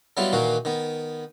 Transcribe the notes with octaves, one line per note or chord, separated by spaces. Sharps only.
F#3 G3 B3 E4 F4
A#2 D#3 E3 A#3 F#4
D#3 B3